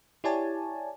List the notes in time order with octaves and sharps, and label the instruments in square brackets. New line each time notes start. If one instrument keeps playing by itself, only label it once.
[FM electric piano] E4 G4 C#5 D5 G#5 A5